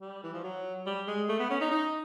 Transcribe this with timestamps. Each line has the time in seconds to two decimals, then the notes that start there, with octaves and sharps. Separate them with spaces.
0.01 G3
0.24 E3
0.34 F3
0.44 F#3
0.86 G3
1.08 G#3
1.29 A3
1.40 B3
1.50 C#4
1.61 D#4
1.71 D#4